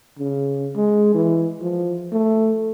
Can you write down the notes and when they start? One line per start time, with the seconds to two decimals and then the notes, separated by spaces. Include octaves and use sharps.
0.19 C#3
0.76 G#3
1.14 E3
1.62 F3
2.12 A3